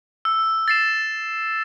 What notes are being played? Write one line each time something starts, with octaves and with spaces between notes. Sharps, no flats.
E6
A6 C7 E7